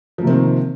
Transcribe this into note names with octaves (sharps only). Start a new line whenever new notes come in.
C3 D#3 F3 A#3 C4